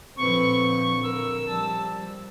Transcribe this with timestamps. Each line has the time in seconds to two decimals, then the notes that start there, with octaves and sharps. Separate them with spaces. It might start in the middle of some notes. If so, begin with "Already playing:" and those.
0.17 A#2 D3 F3 C4 B4 C#6
1.03 A#4 E6
1.48 F3 G3 A5